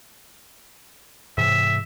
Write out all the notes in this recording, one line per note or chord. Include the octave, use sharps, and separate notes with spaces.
G#2 C3 E3 E5